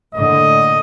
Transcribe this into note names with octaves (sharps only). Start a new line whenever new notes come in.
A2 D3 A#3 D#5